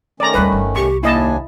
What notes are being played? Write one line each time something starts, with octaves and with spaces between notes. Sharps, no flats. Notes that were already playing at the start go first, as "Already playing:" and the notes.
D#3 A3 C#4 D5 A#5
D#2 A#2 G3 B4
G1
C2 G4 C#6
D#2 A#3 D4 E4 D#5 G#5 A5